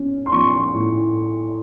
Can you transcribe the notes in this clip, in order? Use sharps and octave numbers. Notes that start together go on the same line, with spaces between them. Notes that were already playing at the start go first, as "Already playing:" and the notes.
Already playing: C#4
C6
F3 C#6
A2